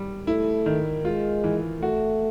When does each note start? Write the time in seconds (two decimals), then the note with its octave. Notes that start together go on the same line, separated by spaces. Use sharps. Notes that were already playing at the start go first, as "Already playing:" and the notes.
Already playing: G3
0.27 A3 E4
0.66 D#3
1.05 G#3 F4
1.44 E3
1.82 A3 F#4